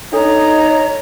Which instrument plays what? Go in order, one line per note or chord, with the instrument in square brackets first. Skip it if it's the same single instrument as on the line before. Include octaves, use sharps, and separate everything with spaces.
[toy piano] D4 A4 [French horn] D#4 [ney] C#5 [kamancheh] A#5